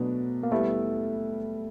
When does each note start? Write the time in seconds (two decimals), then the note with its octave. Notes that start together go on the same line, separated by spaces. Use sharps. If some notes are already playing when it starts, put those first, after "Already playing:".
Already playing: B2 F#3 A3 B3 D4
0.43 A#3
0.51 G3 A3 B3 E4 A4